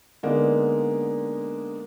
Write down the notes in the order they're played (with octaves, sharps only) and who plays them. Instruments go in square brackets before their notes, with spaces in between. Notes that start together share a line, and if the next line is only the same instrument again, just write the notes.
[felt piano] D3 G#3 A#3 B3 D4 D#4